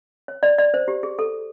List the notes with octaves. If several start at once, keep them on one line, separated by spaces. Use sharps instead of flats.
C#5
D5
D5
C5
G4
G#4
A4